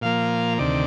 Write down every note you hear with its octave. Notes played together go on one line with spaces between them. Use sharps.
A#2 F3 A#3 F5
D2 C3 D#3 D5